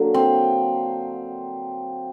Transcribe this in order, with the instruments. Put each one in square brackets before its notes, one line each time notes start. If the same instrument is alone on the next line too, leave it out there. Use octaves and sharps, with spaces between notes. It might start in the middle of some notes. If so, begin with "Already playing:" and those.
Already playing: [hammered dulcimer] D3 F#3 A#3
C4